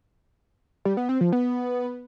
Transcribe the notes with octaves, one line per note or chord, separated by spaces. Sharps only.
G3
B3
C4
F3
B3